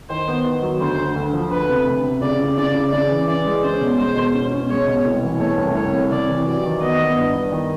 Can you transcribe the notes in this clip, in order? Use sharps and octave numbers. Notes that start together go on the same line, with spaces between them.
D#3 C5
B3
D#3
F#3
D2 C5
D2
D2
F3
D2 B4
C3
D2
C3
C#3 D5
C#3
C#3 D5
C#3
C#3 D5
E3
E3 D5
G#3
C#4 C5
B2
G#3 C5
B2
C#4
C#4
G#3 C#5
B2
C2
E3
A3 C#5
C2
C2 C#5
C3
C3 D5
E3
F#3 D5
D#3
B3 D#5
B3
G2
G2
D#3